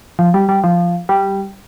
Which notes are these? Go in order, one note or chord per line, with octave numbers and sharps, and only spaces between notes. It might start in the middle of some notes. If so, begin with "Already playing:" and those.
F3
G3
G3
F3
G3